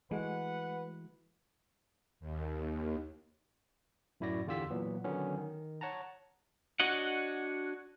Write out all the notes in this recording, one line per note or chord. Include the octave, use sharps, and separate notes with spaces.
E3 G#3 A3 F#4 B4 F#5
D#2
F#2 A2 E4 F#4 D5 A#6
E2 D3 F4 G4 E6 B6
A#2 E3 F#3 B3
D3 D#3 F#3 B3 C#4
D#3
C#5 F#5 A5 A#5
D4 F#4 C#5 D#5 F#5